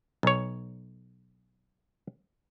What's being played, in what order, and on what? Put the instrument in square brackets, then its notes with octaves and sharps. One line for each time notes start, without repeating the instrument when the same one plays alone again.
[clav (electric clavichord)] B1 C#5